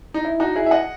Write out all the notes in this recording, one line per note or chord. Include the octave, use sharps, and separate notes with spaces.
D#4
E4
D#4 F#4
E4 G#4
E5
D#5 F#5